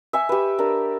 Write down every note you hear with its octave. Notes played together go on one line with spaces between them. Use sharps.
E5 G#5 C#6
G4 B4
D4 A#4